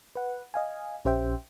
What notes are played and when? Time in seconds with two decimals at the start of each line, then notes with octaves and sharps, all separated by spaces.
0.15 B4 F#5
0.54 D#5 F5 G#5
1.05 A#1 C#4 G4 C5 E5 G5